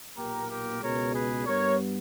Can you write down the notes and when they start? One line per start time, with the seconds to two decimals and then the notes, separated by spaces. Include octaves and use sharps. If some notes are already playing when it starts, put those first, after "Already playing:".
0.17 B1 A#2 A#3 G4 A#4
0.49 G4 A#4
0.82 C#2 B2 G#3 A#4 C#5
1.14 G#4 B4
1.46 G2 G3 B3 A#4 C#5